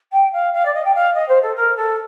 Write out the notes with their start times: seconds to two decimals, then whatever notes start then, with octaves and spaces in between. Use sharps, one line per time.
0.12 G5
0.33 F5
0.53 F5
0.65 D5
0.74 D#5
0.85 G5
0.94 F5
1.14 D#5
1.28 C5
1.42 A4
1.56 A#4
1.76 A4